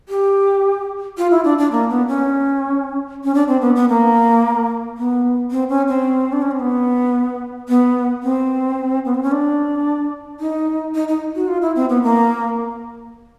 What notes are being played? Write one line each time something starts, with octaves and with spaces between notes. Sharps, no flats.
G4
F4
E4
D4
D4
A#3
B3
C#4
C#4
D4
C4
B3
B3
A#3
B3
C4
C#4
C4
D4
C#4
C4
B3
B3
C4
B3
C4
C#4
D4
D#4
D#4
D#4
F#4
F4
E4
C4
B3
A#3